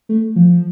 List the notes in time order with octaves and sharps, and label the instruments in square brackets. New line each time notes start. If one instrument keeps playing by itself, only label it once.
[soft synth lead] A3
F3